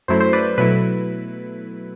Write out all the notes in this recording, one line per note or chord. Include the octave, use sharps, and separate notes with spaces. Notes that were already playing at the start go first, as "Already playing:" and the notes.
F#2 F#3 A3 E4 C5
C5
B4 D5
B2 F#3 A3 E4 B4